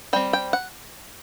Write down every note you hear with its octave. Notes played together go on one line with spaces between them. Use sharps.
G3 C4 G5
G5
F#5